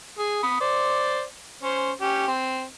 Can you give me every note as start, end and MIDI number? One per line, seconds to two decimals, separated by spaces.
0.19 0.42 68
0.43 0.58 83
0.43 0.58 87
0.61 1.23 72
0.61 1.23 74
1.63 1.92 61
1.63 1.92 72
2.01 2.26 61
2.01 2.26 67
2.28 2.64 60